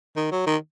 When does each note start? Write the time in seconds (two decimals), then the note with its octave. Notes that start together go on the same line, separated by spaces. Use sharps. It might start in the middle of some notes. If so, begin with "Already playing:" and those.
0.16 D#3
0.32 F#3
0.46 D#3